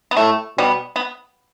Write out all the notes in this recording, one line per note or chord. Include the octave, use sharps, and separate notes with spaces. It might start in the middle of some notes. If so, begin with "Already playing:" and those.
B3
A2 A3
B2 G3 B3
B3